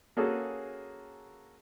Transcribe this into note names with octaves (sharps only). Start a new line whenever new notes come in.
A#3 C#4 F#4 G#4 A4